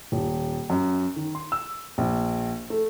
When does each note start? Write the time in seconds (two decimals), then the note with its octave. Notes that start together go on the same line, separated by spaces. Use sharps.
0.12 D#1
0.70 F#2
1.16 D#3
1.35 C6
1.52 E6
1.98 A#1
2.70 A3